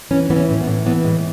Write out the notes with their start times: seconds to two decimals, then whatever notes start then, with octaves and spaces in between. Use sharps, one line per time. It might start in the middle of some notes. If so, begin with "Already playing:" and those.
0.11 E3 C#4
0.30 E3 B3
0.36 C#4
0.49 A2
0.61 B3
0.67 A2
0.86 E3 B3
1.04 A2 G#3